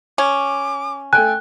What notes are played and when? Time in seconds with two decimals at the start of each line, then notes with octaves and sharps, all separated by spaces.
0.18 C#4 D6
1.13 A3 A4 G5 G#5 F#6